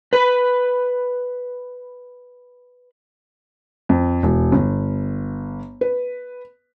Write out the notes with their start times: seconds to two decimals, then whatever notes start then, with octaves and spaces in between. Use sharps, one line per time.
0.13 B4 B5
3.89 F2
4.23 E1
4.52 G1
5.81 B4